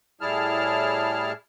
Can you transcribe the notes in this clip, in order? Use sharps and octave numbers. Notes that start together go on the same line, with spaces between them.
A2 G3 E4 G#4 A5 F6